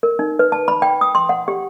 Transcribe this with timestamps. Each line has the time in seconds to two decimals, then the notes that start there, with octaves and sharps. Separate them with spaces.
0.03 A#4
0.19 D#4
0.39 B4
0.52 A5
0.68 B5
0.82 G5
1.01 D#6
1.15 C6
1.29 F#5
1.48 G4